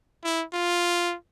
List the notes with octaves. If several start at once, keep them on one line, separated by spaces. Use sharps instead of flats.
E4
F4